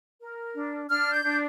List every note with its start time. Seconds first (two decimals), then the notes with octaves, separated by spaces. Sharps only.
0.21 A#4
0.55 D4
0.89 D4 F6
1.13 G6
1.23 D4